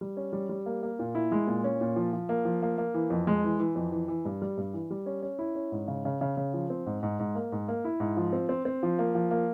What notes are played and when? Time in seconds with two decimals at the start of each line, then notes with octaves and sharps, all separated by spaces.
0.01 G3
0.17 C#4
0.33 G3
0.49 G3
0.66 A#3
0.83 A#3
0.99 A#2
1.15 E4
1.32 G#3
1.47 A#2
1.64 C#4
1.81 A#2
1.96 F3
2.13 F3
2.29 A#3
2.45 F3
2.62 A#3
2.78 A#3
2.94 E3
3.10 F2
3.27 G#3
3.44 E3
3.60 E3
3.75 F2
3.92 E3
4.08 E3
4.25 G2
4.42 G3
4.57 G2
4.73 E3
4.90 G3
5.06 C#4
5.22 C#4
5.39 E4
5.55 C#4
5.72 G#2
5.88 C#3
6.05 C#3
6.21 C#3
6.37 C#3
6.54 F3
6.70 C4
6.86 G#2
7.03 G#2
7.19 G#2
7.35 A#3
7.52 G#2
7.68 A#3
7.85 E4
8.00 G#2
8.17 F3
8.33 C4
8.49 C4
8.65 C4
8.83 F3
8.99 A#3
9.15 F3
9.31 A#3